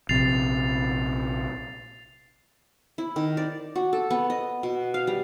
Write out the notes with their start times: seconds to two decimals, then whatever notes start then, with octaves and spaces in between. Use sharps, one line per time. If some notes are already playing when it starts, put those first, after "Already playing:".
0.09 A#1 C3 A6 C7 F7
2.98 E4
3.16 D#3
3.37 D5
3.75 F#4
3.93 A4
4.10 B3
4.30 D#5
4.63 B2
4.94 F5
5.07 G3